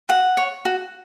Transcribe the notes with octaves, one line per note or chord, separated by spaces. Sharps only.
F#4 F#5
C#5
F#4